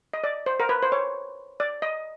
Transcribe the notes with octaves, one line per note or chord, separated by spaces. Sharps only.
D#5
D5
C5
A#4
B4
C5
C#5
D5
D#5